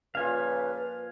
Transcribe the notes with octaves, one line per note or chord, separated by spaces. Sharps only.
A#2 C#3 F3 F4 B4 F5 G#5